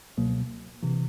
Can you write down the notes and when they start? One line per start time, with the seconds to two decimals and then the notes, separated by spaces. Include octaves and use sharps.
0.17 C#2 B2 F#3 A#3
0.83 C3 E3